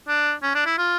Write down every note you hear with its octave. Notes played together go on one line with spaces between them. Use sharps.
D4
C#4
D4
E4
F4